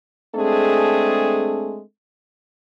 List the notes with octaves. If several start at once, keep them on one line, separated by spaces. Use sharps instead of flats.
G#3 A3 C4 D4 G#4 A4